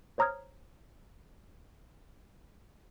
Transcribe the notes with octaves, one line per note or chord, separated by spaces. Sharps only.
C5 C#5 A#5 D#6 F6 G#6